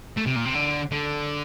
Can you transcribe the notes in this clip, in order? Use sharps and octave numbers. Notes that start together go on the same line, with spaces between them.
A3
C3
A#2
C3
D3
D3